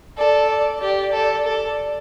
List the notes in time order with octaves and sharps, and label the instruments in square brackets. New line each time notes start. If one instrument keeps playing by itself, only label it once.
[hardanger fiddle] A4 [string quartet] D5
[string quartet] D5
[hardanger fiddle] G4 [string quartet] D5
[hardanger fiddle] A4
A4